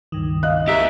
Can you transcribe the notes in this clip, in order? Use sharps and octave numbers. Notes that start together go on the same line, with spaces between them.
C#2 G2 D#3
D#5 F5 F#6
G4 A#4 E5